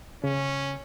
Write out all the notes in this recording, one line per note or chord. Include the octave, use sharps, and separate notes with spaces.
C#3 C#4